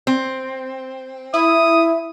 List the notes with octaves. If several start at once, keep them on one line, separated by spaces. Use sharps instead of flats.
C4
E4 E5 D#6